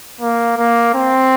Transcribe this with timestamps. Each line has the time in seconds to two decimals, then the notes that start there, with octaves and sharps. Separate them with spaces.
0.21 A#3
0.58 A#3
0.95 C4